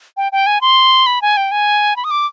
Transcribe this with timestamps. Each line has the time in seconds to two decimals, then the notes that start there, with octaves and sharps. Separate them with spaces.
0.17 G5
0.32 G5
0.46 G#5
0.61 C6
1.06 B5
1.22 G#5
1.37 G5
1.51 G#5
1.96 B5
2.04 D#6
2.11 D6